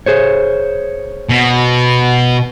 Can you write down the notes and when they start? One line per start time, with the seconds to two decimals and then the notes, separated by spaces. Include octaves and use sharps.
0.06 G#4 C5 C#5
1.29 B2